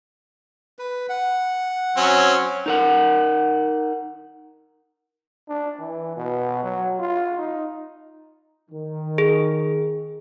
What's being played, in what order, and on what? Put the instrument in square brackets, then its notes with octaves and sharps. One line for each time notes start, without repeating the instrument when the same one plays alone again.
[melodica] B4
F#5
[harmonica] F#3 C4 C#4
[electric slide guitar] D#4 A#4 F#5
[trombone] D4
E3
B2
F#3
F4
D#4
[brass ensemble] D#3
[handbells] G#4